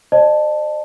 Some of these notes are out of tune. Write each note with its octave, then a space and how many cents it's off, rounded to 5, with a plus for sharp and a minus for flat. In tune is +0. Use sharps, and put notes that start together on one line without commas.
C5 +20 D#5 -45 A5 +0